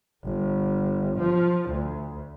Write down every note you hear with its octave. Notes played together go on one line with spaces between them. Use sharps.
G1
F3
D2